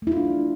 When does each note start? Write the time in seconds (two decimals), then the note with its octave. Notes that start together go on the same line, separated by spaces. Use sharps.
0.02 A3
0.07 E4
0.12 F4
0.17 D4